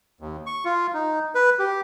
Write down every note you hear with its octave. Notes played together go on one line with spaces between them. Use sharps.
D#2
C#6
F4
D#4
B4
G4